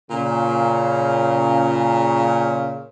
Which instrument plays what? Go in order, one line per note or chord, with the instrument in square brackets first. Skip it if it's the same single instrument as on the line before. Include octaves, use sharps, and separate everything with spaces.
[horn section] A#2 C#3